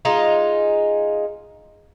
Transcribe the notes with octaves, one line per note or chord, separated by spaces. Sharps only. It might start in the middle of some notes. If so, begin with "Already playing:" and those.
G#3 D#4 F4